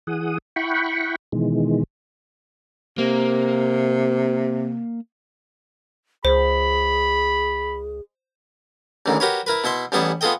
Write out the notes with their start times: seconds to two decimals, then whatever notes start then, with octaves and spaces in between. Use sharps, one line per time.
0.07 E3 G#4 F#5 D#6
0.56 E4 F#5 G5 B5 C#6
1.32 B2 D#3 E3 G#3
2.98 C3 A#3
6.25 C#2 G#4 C5 B5
9.06 A1 D2 G#2 D#3 E3
9.20 F#4 G4 A#4 B4 C#5
9.47 E4 A#4 B4
9.64 B2 E4 E5 C6
9.92 A1 G3 B3 E4 G#4 A5
10.21 B3 F4 G#4 A4 D#5 G5